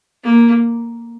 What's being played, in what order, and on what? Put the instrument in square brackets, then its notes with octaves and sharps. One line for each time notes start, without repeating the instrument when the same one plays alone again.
[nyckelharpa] A#3